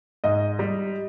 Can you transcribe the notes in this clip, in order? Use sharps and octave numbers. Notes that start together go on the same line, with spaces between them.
G#2 D#5
G3